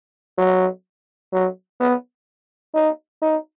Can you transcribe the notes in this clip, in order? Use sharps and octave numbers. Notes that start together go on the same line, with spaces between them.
F#3
F#3
B3
D#4
D#4